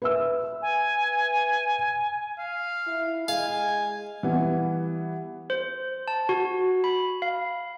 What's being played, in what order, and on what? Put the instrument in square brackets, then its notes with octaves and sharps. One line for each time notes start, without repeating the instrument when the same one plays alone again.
[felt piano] B4 E5 E6
[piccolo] G#5
[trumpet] F5
[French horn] E4
[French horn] G#3 [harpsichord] F5 [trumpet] G#5
[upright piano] E3 G3 B3
[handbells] C5
A5
F#4
B5
F5